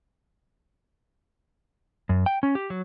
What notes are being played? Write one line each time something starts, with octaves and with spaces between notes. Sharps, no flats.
F#2
G5
C#4
G4
F#3